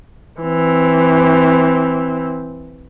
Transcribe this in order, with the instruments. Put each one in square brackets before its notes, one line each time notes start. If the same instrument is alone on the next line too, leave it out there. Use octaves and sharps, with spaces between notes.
[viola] E3 C4